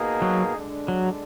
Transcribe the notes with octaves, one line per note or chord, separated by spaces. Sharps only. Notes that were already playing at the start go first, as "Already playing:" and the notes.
Already playing: B2 A#3 D#4 G#4
F#3
D3 G#3 D4
F#3